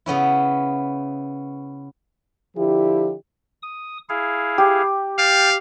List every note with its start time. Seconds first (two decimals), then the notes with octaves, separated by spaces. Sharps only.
0.06 C#3 B3 C#4 E4
2.57 D3 F3 E4 G4
3.63 D#6
4.09 E4 G#4 F5
4.58 G4
5.18 F5 G5 A5 F6